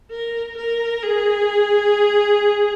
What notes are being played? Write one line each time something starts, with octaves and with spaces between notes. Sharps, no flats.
A#4
A#4
G#4